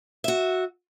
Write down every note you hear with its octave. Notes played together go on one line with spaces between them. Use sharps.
F#4 E5